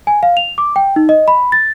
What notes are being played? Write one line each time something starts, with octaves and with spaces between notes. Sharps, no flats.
G#5
F5
F7
D6
G5
D#4
D#5
B5
A6